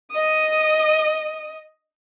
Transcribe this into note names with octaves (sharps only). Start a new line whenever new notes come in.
D#5 D#6